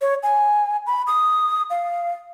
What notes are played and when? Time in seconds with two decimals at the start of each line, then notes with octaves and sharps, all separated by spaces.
0.01 C#5
0.23 G#5
0.87 B5
1.07 D#6
1.70 F5